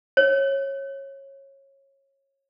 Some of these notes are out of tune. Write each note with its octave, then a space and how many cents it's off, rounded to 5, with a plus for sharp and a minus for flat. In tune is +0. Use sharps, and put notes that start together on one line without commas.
C#5 -20